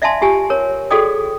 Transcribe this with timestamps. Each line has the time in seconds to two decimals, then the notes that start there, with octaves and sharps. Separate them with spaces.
0.02 D5 E5 F5 G#5 A5 C6
0.21 F4 G4 G#5 A5
0.50 A#4 C#5
0.91 F#4 G#4 A4 D5 G5 D#6